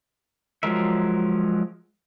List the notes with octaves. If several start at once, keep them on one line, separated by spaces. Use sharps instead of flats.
F3 F#3 G#3 A#4 E5